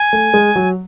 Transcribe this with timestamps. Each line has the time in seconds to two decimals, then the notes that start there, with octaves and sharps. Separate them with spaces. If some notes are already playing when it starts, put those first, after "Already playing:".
Already playing: G#5
0.13 A3
0.34 G#3
0.56 F#3